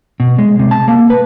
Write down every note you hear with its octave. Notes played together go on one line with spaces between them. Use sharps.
B2
G#3
C3
A5
A#3
B4